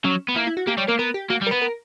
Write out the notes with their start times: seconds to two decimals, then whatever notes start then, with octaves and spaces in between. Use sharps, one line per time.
0.04 F#3 C#4
0.28 B3
0.36 A#3 E4
0.47 E4
0.57 F#4
0.67 A#3 G4
0.77 G3 C#5
0.88 A#3 A#4
0.99 B3 A#4
1.14 G4
1.30 A#3 F#4
1.41 G3
1.47 A#4
1.51 B3 B4
1.62 A#4